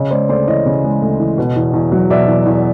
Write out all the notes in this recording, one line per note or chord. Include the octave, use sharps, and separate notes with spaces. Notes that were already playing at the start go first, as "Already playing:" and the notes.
Already playing: C#3 C#5 D#5
G#3 C5 D5
D2 C5 D5
E3 C#5 D#5
C#3
G#3
D2
E3
B2
E2
E2
F#3
B2 D5 E5
E2
E2